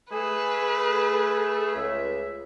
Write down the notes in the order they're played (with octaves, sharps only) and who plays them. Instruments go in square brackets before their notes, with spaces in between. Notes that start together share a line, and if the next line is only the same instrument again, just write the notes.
[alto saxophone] A3 [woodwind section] G#4 [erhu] B4
[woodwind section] C#2 E5